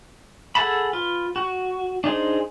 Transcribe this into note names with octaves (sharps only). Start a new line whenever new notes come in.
G#4 A4 F#5 A5 B5
F4 B4
F#4
D4 D#4 G#4 C5